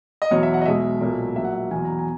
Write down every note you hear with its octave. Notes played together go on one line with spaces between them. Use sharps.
D#5
E2 B2 F#3 C#5
E5
F#5
D#5
B1 B2 G#3 E5
B1 A#2 F#3
A#1 A#2 F#3 E5
F#5
E5
E2 B2 F#3 G#5
A#5
G#5